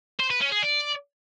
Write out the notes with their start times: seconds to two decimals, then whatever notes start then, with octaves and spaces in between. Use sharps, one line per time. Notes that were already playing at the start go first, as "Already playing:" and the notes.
0.20 C5
0.31 B4
0.41 C#4
0.52 G#4
0.63 D5